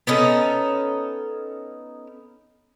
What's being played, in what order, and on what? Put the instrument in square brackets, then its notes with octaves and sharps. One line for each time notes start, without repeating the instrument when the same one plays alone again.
[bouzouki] B3 C#4 D#4 A4